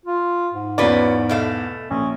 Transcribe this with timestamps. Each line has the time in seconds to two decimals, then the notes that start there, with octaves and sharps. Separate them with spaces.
0.06 F4
0.54 G#2
0.78 E2 C#4 F4 B4 D5
1.29 B2 A3 F5
1.91 A#1 C#4